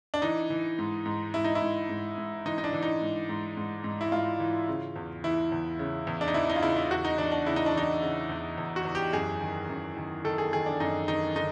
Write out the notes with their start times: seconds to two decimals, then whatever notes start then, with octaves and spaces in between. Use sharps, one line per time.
0.14 D4
0.22 E3 D#4
0.50 E3
0.79 G#2
1.06 G#2
1.34 G#2 E4
1.44 D#4
1.55 E4
1.62 G#2
1.89 G#2
2.17 G#2
2.46 E3 D#4
2.58 D#4
2.64 D4
2.73 E3
2.82 D#4
3.01 G#2
3.29 G#2
3.57 G#2
3.84 G#2
4.01 E4
4.12 G#2 F4
4.40 E3
4.68 C#3
4.96 E2
5.24 E3 E4
5.52 E2
5.79 C#3
6.07 E2
6.21 D4
6.28 D#4
6.34 E3 E4
6.49 D#4
6.56 F4
6.63 C#3 E4
6.76 E4
6.91 E2 F#4
7.05 D#4
7.18 E2 D4
7.32 D4
7.46 C#3 E4
7.56 D#4
7.66 D4
7.75 E3 D#4
8.02 C#3
8.29 E2
8.58 E2
8.76 F#4
8.85 E2
8.95 G4
9.13 F#2 G#4
9.41 D#3
9.69 F#2
9.97 D#3
10.25 D#3 A4
10.38 G#4
10.53 D#3 G#4
10.66 D4
10.80 F#2 D#4
11.08 D#3 D#4
11.36 D3 D#4